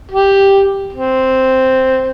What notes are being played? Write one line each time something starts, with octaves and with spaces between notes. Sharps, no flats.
G4
C4